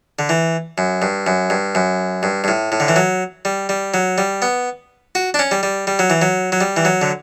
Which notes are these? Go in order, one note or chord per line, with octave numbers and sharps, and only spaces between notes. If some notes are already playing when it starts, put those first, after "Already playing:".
D3
E3
F#2
G2
F#2
G2
F#2
G2
G2
A2
A2
D3
E3
F#3
G3
G3
F#3
G3
B3
F#4
D4
C#4
G3
G3
G3
F#3
E3
F#3
F#3
G3
E3
F#3
D3